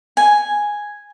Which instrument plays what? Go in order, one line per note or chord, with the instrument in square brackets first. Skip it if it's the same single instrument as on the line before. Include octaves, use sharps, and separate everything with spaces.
[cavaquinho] G#5